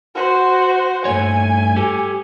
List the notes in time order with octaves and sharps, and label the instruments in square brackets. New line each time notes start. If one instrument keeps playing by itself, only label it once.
[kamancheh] F#4 C5
[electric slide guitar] G2 A3 C#5 [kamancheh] G#5
[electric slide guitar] G4 A4